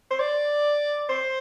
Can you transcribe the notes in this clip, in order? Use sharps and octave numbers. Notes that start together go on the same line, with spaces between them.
C5
D5
C5